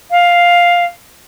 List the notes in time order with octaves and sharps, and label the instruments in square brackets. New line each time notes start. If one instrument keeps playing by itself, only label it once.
[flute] F5